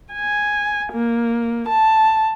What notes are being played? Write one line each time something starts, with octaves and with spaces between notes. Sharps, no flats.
G#5
A#3
A5